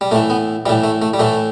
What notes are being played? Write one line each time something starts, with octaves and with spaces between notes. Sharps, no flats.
G3
A2 E3 A3
B3
A2 E3 G3
A3
A3
G3
A2 E3 A3